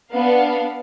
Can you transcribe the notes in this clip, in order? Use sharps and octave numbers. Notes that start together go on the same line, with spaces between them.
B3 D4 F5